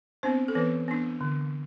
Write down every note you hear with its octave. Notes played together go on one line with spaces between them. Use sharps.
B3 C4 D4 C5
A4
E3 B3 B4
B3 D4
D3